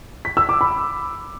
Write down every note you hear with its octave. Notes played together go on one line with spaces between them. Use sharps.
B6
E6
D6
B5